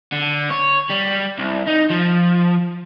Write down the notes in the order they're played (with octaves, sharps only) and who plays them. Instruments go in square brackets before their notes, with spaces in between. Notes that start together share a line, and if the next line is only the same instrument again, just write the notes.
[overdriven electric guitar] D3
C#5
G3
C2
D#4
F3